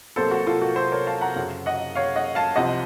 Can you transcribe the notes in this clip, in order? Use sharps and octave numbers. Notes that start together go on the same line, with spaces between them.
C2 C3 F#3 A#3 A4 C5
F#4
F4 A4
F#4 A#4
A4 C5
A#4 C#5
F5 A5
F#5 A#5
F#2 C#3 F#3
D#5 F#5
C#5 F5
D#5 F#5
F5 A5
C2 C3 F3 C4 D#5 F#5